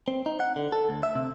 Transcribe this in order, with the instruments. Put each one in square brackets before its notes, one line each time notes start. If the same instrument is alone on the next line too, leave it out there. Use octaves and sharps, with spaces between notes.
[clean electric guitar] C4
D#4
F#5
D3
A4
D2
E5
C3